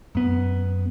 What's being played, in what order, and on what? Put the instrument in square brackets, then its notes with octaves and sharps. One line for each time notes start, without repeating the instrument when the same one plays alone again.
[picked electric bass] F#2 B3